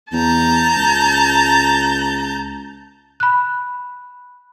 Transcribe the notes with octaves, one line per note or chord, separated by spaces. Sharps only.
E2 A5 A#5 G6
C#2
B5 F#6